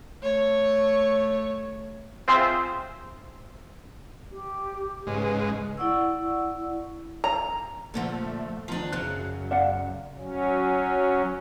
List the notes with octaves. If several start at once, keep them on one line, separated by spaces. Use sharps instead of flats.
A3 C#5
C4 F4 G#4 C5 E5 C6
G4
G#2 C#3 G#3 B4
E4 D5 F#5 C#6 E6
A#5
A#2 D3 F3 A3
D#3 F3 D4
F#2 C#3 F#3 F#6
D5 F5 F#5
F#3 C#4